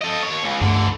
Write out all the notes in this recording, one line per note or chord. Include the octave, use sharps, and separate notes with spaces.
A4 D#5
D#2 C#5
C#2
C#2 G2 D3 E3 A3